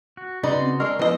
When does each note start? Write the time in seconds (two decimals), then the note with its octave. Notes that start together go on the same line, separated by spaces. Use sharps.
0.17 F#4
0.43 C#3 D#4 F#4 B4 D5 C6
0.62 C4
0.80 G#3 D4 A#4 C#6 E6
0.99 F3 G#3 B3 E4 B4 D#5 E5